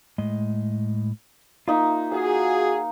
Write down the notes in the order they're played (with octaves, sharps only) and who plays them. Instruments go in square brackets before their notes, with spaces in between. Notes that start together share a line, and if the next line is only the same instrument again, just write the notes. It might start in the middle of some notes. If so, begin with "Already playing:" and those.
[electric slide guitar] A2 G#3 D#5
[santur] A#3 D#4 [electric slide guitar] F4 E5
[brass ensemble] F#4 G#4 [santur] F5